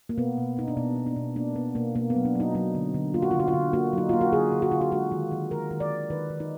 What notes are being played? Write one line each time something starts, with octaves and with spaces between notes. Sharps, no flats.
A#3
B2 B3
B2
B2 D#4
D4
B2 B3
B2
D4
B2
A#3 D4
B2 B3
B2 A#3
B2 A#3
B3
F#3
D4
F#3
D#4
F#3 D#4
D3
D3
A#3 F4
F#4
D3 F4
F#4
F4
D3
A#3 F#4
F#3 D#4
A#3 F4
F#4
D3 G#4
D3
F#4
D3 F4
F#4
G#3 F#4
D#3
D#3
G#3 A#4
D#3
D5
D#3
D#3 B4
D#3
D#4